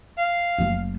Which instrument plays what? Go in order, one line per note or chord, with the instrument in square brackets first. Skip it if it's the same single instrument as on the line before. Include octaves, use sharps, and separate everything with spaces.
[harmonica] F5
[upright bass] F#1 A3